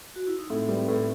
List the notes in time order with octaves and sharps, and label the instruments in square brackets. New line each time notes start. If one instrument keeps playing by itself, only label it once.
[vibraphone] F#4
E4
D#4
[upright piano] A2 [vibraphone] C4
[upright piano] G3 [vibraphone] B4
[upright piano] A2 [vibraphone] B4